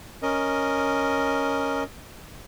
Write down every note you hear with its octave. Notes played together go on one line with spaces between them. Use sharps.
C#4 A#4 D#5